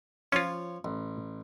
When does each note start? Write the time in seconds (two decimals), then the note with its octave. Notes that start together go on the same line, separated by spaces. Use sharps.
0.32 F3 C#4 F4 C#5
0.85 A1